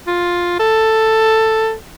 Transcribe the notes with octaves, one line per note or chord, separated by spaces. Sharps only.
F4
A4